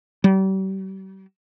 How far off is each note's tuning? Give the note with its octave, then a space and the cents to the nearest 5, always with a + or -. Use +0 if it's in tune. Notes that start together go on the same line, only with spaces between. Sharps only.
G3 -40